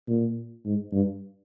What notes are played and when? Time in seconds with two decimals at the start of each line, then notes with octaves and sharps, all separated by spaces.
0.08 A#2
0.66 G#2
0.93 G2